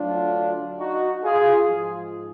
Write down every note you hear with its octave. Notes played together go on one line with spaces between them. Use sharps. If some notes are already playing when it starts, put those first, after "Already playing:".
Already playing: D2 D3 F#3 D4 F4
D#4 F#4
F4 G#4
G#2 F3